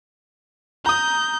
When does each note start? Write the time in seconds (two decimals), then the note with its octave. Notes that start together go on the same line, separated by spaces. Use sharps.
0.86 A#5 D#6 G6